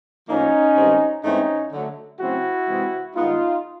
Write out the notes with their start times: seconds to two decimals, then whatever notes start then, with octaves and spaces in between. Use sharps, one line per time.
0.29 A2 F3 A#3 C#4 D#4
0.76 G2 D#3 G#3 C4
1.24 G#2 E3 A3 C4 C#4 D#4
1.72 D3 F#3 A3
2.20 C#3 F#3 A3 C4 E4 F#4
2.68 C3 E3 G#3 C4
3.15 G2 D#3 G#3 B3 D#4 F4